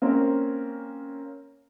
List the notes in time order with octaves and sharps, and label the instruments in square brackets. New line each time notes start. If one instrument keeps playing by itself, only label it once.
[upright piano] A#3 C4 C#4 A#4